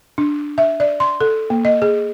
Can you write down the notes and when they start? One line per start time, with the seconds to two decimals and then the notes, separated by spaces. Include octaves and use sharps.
0.18 D4
0.58 E5
0.80 D5
1.00 C6
1.21 A4
1.50 A#3
1.65 D#5
1.82 G#4